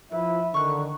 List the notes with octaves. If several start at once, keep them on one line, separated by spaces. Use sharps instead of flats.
F3 E4 B4 E5
D3 D#3 C#6 F#6